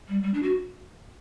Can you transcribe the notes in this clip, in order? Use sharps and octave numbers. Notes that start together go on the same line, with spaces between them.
G3
G3
D4
F#4